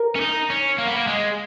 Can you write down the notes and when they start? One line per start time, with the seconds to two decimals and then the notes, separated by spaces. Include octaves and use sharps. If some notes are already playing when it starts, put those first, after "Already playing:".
Already playing: A#4
0.16 C#4
0.21 D#4
0.50 C#4
0.78 A#3
0.87 B3
0.96 A#3
1.07 G#3